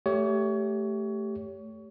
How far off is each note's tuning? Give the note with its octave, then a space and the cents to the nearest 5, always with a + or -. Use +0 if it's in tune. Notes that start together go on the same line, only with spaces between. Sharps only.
A3 +0 G4 +0 C#5 +25